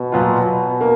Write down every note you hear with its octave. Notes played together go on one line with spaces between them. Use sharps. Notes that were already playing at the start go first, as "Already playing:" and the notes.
Already playing: B2
A#2 F#3 B3 F4
A#3